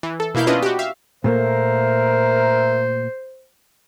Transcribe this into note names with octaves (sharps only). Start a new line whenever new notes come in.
E3
A4
B2 A#3 E4 F5 G6
C#4 D4 E4 F4 B4 D#5
F#4 G4
E5 F5
A#2 A3 A#3 A#4 C5 E5